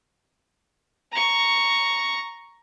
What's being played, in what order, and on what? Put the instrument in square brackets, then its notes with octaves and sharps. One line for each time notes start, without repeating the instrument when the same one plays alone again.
[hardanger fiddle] A#5 C#6